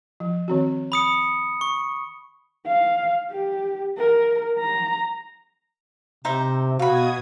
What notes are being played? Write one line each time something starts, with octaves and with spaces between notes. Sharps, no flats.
F3
D#3 C4 F#4
B5 D#6 C#7
C#6
F5
G4
A#4
A#5
C3 D#4 C5 E5
B2 F#4 F5 B5 D#6 G#6